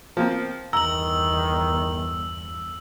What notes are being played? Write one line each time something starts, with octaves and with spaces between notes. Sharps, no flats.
F3 A#3 C4
G1 E2 D#3 A#5 E6 F#7